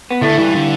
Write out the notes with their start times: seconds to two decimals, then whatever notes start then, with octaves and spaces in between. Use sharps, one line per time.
0.11 B3
0.21 A2 D3 A3
0.38 G2 E3 G3
0.55 D3